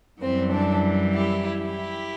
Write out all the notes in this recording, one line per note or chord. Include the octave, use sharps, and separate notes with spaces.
F#2 E3 G3 C4
D4
E4 G4
E4 G4